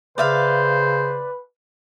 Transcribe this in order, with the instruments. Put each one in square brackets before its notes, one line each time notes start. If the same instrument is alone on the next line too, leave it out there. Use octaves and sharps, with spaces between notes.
[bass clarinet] C#3 [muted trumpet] B4 [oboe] C5 [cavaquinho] D5 E5 F5